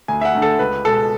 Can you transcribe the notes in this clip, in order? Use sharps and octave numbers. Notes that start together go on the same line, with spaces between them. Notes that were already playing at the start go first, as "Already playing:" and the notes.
D2 G#5
E5
F#5
D3 A3
A4
C#2 B4
B2 G#3 B3 A4